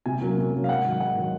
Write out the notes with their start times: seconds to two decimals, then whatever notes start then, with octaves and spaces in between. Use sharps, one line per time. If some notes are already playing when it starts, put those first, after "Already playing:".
0.06 C3 G#5
0.21 F#3 A#3 C#4
0.37 C3
0.53 F#3 A#3 C#4
0.64 F5
0.69 G#2 F#5
0.84 D#3 F#3
1.00 G#2 F#5
1.17 D#3 F#3